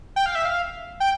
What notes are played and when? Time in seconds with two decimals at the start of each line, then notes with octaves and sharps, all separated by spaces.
0.16 G5
0.26 F5
0.35 E5
0.45 F5
1.00 G5